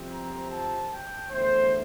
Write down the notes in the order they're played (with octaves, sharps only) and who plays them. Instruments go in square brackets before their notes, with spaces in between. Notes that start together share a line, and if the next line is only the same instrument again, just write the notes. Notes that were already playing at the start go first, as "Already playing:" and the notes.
Already playing: [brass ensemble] F2 C3 F3 C4
A#5
A5
G5
E2 D3 A3 C5